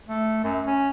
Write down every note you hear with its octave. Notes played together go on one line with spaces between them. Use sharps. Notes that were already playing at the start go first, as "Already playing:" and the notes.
A3
F#2
C#4